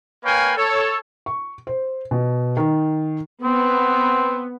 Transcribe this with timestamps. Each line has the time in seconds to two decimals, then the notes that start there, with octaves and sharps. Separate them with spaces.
0.23 A#3 B4 C#5 F5 G5 G#5
0.56 A4 C#5
1.26 C#6
1.67 C5
2.11 B2
2.57 D#3
3.44 B3 C4